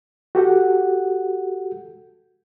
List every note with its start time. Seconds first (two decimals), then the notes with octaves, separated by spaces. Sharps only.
0.35 F#4 G4 A4 F#5